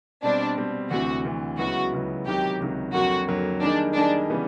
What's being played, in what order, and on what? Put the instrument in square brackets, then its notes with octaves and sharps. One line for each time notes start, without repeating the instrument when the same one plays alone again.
[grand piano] B2 G3 C4 [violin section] D4
[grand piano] B2 G3 C4
[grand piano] D2 C3 E3 [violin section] F#4
[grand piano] D2 C3 E3
[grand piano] C#2 C#3 F#3 B3 E4 [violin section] F#4
[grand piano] C#2 C#3 F#3 B3 E4
[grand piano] C#2 C3 D#3 F#3 [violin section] G4
[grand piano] C#2 C3 D#3 F#3
[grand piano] F2 D3 F#3 A#3 [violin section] F#4
[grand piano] F2 D3 F#3 A#3
[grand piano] D#3 G3 A#3 D#4 G#4 [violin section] D4
[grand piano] D#3 G3 A#3 D#4 G#4 [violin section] D4
[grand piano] C#3 E3 G3 B3